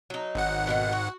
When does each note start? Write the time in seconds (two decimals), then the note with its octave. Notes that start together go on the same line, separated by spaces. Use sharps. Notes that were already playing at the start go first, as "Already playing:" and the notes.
0.10 F#3 D#4
0.35 G#1 F#5
0.67 B2 D3 D#3
0.93 F#4